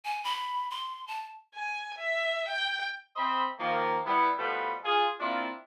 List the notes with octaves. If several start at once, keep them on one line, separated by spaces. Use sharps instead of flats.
G#5
B5
C6
A5
G#5
E5
G5
C4 C5 D#5 E5 B5 C6
D#3 F3 A#3
G3 B3 E4
B2 F3 G3 A3 B4
F4 G#4
A#3 C4 D4 E4 F4